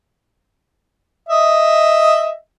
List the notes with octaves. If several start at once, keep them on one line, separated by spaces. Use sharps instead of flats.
D#5 E5